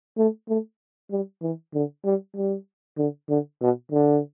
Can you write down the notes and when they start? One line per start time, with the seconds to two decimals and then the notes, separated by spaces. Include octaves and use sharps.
0.18 A3
0.49 A3
1.11 G3
1.42 E3
1.74 D3
2.05 G3
2.37 G3
2.98 D3
3.29 D3
3.61 B2
3.92 D3